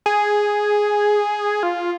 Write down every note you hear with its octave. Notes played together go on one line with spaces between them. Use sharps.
G#4
F4